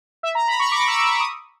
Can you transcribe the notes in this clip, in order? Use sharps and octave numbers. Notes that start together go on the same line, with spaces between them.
E5
A#5
B5
C#6
D6
E6
E6
D#6